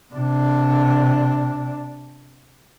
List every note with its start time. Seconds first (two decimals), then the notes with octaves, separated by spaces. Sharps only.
0.14 C3 D4